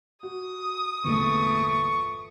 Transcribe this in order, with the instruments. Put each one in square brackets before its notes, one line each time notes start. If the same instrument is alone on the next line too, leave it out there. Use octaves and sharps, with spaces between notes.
[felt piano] F#4 [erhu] D#6
[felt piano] G1 A#2 D#7 [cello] E2 A3 [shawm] C#6